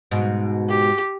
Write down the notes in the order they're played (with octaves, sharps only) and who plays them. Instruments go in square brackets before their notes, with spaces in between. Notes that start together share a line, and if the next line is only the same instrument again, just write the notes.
[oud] G#2 B2
[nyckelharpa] G4